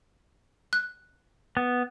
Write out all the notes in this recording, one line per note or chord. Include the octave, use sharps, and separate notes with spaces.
F#6
B3